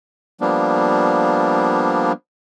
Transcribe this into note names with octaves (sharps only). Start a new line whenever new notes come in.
F3 G3 A#3 B3 D4